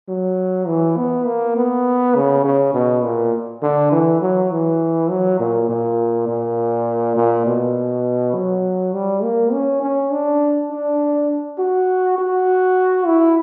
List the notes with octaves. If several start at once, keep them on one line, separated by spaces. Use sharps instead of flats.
F#3
E3
B3
A#3
B3
C#3
C#3
B2
A#2
D3
E3
F#3
E3
F#3
A#2
A#2
A#2
A#2
B2
F#3
G3
A#3
C#4
C#4
D4
D4
F#4
F#4
E4